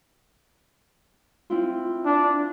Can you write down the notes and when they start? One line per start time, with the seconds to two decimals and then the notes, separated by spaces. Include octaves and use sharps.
1.50 C4 E4 F4
2.06 D4